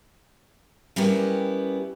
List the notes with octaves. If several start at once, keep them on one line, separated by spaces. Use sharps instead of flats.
G3 A#3 B3 C#4 E4 G4